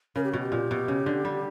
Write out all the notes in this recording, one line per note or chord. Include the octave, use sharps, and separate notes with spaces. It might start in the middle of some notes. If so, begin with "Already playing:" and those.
C#3 A#4
G4
B2 F#4
G4
A#2
B2
C#3
D3
G3